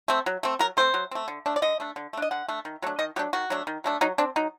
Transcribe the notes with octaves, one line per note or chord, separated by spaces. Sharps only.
A3 C4
F#3
A3 C4
F#3 A#4
A3 C4 C5
F#3
A3 C4
D3
A3 D4
D5
D3 D#5
A3 D4
D3
A3
D4 D#5
D3 F#5
A3 D4
D#3
F#3 A3 D4
D#3 D#5
F#3 A3 D4 G4
D#3 F#4
F#3 A3 D4
D#3
F#3 A3 D4
F#3 D#4
C4 D4
F#3 D#4